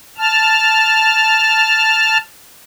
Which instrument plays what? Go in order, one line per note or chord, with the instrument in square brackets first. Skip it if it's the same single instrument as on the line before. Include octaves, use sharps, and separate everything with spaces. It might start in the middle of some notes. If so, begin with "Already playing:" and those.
[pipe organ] A5 F6